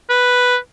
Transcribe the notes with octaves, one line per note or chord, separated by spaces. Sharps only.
B4